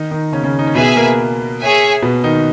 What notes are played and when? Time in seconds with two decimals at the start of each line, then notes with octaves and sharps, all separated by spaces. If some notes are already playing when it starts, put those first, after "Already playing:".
Already playing: D#3 D#4
0.11 D#3 D#4
0.32 C#3 C#4
0.43 C#3 C#4
0.59 D#4
0.67 C#4
0.75 B2 B3 G#4 B4 E5 G#5
0.96 A#3 A#4
1.60 G#4 C#5 E5 G#5
2.02 B2 B3
2.24 D#3 D#4